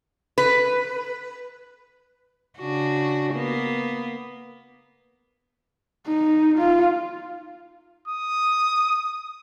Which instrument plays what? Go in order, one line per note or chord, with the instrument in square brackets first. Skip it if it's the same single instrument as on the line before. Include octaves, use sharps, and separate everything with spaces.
[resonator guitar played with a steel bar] B4
[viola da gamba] C#3 D4 F#4
A#3 B3
[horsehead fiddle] D#4
F4
[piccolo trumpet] D#6